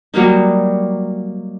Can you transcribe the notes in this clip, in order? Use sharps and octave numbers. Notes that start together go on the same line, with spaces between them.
F#3 G3 A#3 D#4